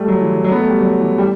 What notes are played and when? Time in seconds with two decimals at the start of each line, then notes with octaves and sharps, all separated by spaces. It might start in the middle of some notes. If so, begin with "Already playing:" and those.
Already playing: G3 A3
0.08 F#3
0.20 E3
0.32 E3
0.44 F#3
0.52 B3
0.57 A3
0.69 G3
0.80 F#3
1.00 E3
1.18 G3